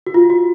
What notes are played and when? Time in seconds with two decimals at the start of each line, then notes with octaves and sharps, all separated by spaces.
0.07 F#4
0.14 F4
0.30 F#4